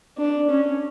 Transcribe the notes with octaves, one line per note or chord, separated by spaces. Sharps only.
D4
C#4